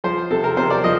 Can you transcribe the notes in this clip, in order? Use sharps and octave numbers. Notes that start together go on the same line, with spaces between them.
F3 C5
C3 A4
A#4
C3 C5
D5
F3 D#5